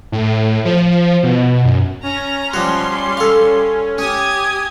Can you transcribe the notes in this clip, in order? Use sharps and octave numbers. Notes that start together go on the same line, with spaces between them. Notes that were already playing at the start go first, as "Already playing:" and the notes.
A2
F3
B2
F#2
C#4 A#5
F3 G3 F#4 C6
A4 F5
C#4 G4 G#5 D#6